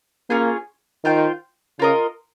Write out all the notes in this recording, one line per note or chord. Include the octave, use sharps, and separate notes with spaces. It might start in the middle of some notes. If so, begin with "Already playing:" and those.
A#3 C#4 F4 G#4
D#3 F4 C5 G5
C#3 F4 A#4 D#5